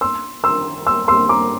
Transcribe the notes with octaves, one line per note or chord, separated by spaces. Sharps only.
C6 E6
C6 E6
C6 E6
C6 E6
A#5 D6